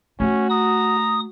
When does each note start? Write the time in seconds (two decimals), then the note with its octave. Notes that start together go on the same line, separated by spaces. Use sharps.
0.20 A3 C#4 F#4
0.50 A#5 D#6